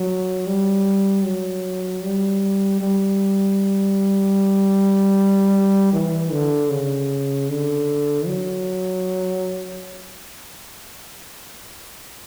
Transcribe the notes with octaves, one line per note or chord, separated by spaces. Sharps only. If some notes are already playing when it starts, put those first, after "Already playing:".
Already playing: F#3
G3
F#3
G3
G3
E3
D3
C#3
D3
F#3